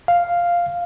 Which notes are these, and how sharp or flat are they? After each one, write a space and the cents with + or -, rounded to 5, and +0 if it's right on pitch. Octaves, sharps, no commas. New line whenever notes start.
F5 +0